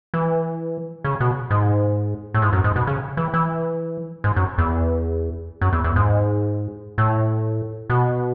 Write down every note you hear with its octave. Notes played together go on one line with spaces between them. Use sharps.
E3
C#3
B2
G#2
A2
G#2
F#2
G#2
B2
C#3
E3
E3
G#2
F#2
E2
F#2
E2
E2
G#2
A2
B2